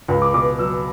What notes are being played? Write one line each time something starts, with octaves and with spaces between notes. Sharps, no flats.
C#2
D6
B2 D6
F#3 E6